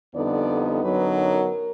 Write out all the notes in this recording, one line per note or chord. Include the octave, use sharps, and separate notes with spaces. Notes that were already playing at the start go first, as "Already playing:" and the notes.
F2 D3 G3 B3 D#4 D5
F#2 D3 F#3 B3 D#4 B4
A#4